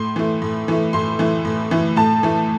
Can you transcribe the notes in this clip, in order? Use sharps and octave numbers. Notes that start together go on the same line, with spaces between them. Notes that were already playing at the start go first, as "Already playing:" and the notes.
Already playing: A2 C6
E3 A3
A2
E3 A3
A2 C6
E3 A3
A2
E3 A3
A2 A5
E3 A3